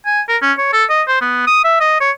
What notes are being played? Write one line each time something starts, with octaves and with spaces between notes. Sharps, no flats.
G#5
A#4
C#4
C#5
A4
D#5
C5
B3
D#6
E5
D#5
C#5